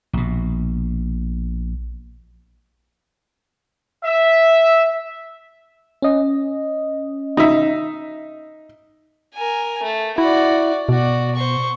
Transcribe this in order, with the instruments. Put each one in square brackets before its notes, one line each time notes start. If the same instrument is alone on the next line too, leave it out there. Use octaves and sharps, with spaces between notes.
[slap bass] A#1 B2
[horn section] E5
[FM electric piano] C#4 D#5
[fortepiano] D#4 E5
[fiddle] A#4 G#5
A3
[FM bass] E4 [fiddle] F#4 D5
[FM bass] B2 [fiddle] F#4 D5
[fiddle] C5 C#6